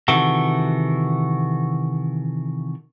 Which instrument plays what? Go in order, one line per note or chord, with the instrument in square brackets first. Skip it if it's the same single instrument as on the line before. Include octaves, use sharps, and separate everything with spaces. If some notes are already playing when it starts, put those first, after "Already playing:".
[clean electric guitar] C3 D#3 E3 F#4 A4